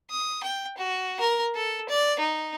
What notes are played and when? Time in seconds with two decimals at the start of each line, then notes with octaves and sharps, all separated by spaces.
0.10 D#6
0.43 G5
0.78 F#4
1.20 A#4
1.55 A4
1.89 D5
2.20 D#4